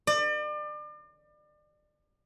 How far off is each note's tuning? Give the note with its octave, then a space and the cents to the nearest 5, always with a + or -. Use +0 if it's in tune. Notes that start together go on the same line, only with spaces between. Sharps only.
D5 +35